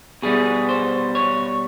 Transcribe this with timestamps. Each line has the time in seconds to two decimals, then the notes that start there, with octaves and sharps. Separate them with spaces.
0.22 B2 G3 B3 G#4
0.69 C5
1.15 C#5